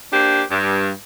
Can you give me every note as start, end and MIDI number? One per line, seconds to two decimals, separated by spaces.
0.13 0.42 58
0.13 0.42 62
0.13 0.42 67
0.13 0.42 72
0.49 0.90 43